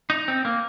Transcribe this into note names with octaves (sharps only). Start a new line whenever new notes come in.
D#4
C4
A#3